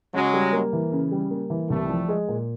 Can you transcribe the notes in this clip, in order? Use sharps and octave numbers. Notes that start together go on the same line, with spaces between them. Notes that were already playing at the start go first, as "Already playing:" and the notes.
C#3 F#3 G#3
G3
A#3
E3
C#3
G3
A#3
E3
C2 G3 A3
F3
G#3
A#2